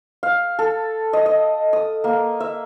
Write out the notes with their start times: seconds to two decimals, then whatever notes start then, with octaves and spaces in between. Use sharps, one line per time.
0.23 F5
0.59 A4
1.13 D#5
1.26 D#5
1.73 D#6
2.04 A#3
2.40 E5